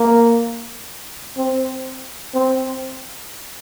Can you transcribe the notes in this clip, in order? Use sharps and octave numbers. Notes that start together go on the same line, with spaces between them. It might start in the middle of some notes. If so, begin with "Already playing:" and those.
Already playing: A#3
C4
C4